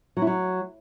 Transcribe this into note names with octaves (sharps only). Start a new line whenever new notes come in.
F#3
E4
F#3